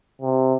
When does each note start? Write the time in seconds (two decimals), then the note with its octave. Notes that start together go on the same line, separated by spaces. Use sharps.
0.22 C3